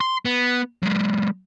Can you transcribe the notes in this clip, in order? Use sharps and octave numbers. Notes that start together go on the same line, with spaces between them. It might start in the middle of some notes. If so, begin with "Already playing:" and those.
C6
B3
F#3 G#3